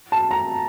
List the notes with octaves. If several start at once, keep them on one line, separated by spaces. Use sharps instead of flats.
A5
A#5